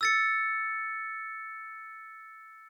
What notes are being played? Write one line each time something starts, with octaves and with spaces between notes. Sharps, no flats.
E6 A6 C#7